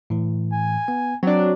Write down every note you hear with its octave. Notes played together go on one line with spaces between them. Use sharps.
A2 E3
G#5
B3
F#3 C4 D4